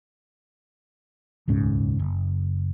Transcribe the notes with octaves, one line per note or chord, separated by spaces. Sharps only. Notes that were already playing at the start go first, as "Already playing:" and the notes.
D#1 C#2 G#2 C#4
F#1